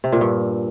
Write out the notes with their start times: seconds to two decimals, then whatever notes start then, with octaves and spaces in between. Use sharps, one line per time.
0.04 C3
0.12 A#2
0.21 G2